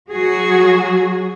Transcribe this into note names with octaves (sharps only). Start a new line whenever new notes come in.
F#3 F#4 G#4